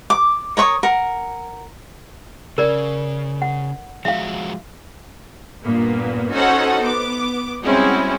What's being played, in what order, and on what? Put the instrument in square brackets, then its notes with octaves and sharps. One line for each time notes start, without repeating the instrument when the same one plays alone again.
[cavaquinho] D6
A#4 C#5 C#6 D#6
A#4 F#5
[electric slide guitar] C#3 [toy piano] A#4 D5
[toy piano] F#5
[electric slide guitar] F3 G#3 F#4 [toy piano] E5 F5
[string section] G2 A#2 A#3 B3
C#4 D#4 F#4 A4 C5 F#5
B3 D6
G3 G#3 C4 C#4 E4 F#4